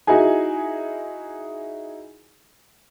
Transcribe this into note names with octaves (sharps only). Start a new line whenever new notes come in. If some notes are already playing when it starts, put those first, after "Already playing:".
D#4 E4 F#4 G#4 G#5